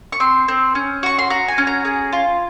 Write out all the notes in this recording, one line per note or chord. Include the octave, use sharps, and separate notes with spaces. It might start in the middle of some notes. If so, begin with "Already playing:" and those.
C#6
C4 C6
C4
C#4
F#4 C#6
C6
F#4 A#5
G#5
C#4
A#5
G#4
F4